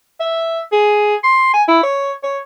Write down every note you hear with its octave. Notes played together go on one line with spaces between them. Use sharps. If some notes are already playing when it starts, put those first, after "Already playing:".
E5
G#4
C6
G#5
E4
C#5
C#5